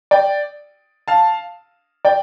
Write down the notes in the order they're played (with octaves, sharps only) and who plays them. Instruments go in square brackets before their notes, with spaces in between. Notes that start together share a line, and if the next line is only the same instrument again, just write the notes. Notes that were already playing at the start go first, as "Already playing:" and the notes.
[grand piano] D5 G5
F5 A5
D5 G5